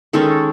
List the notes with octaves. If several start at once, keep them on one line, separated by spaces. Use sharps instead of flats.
D#3 G#3 C#4 A4